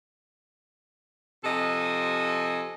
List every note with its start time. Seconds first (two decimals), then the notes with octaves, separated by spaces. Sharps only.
1.44 C3 F3 A4 D#5 G#5